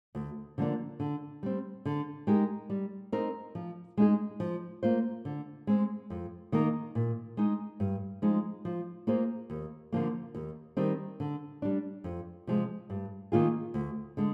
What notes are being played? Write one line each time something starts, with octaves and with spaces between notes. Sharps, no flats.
D2
D3 F3 A#3 D4
D3
G3 C4
D3
G#3 D#4 G4 A#4
G3
C4 D#4 A#4
F3
G#3 D#4 G#4
F3
A#3 F4 C5
D3
G#3 C4
F2
D#3 A#3 D#4 A#4
A#2
G#3 D#4
G2
F3 G#3 D#4
F3
A#3 F4 G#4 C5
D#2
D3 F3 A#3
D#2
D#3 G3 C4
D3
G3 D4
F2
C3 F3 G#3
G2
D#3 A#3 F4 G#4
D2
D3 G#3